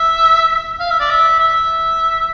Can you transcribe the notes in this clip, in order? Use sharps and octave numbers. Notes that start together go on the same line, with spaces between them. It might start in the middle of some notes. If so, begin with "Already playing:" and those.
Already playing: E5
F5
E5
D5
E5
E5